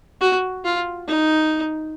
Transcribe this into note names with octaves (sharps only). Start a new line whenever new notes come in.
F#4
F4
D#4